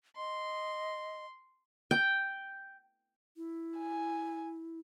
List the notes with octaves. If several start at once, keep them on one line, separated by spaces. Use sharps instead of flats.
D#5 C6
G5
E4
G#5